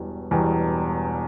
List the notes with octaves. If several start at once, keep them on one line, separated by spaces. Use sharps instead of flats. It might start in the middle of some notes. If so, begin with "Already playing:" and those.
Already playing: E1 E2 B2 G3
E1 E2 B2 G3